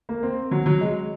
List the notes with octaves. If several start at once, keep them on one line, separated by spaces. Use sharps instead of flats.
A#3
C4
F#3
F#3
G#3